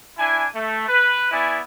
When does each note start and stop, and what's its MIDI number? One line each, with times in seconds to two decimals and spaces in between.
0.18 0.46 62
0.18 0.46 64
0.18 0.46 80
0.54 0.87 57
0.88 1.31 71
1.31 1.60 59
1.31 1.60 64
1.31 1.60 74
1.31 1.60 80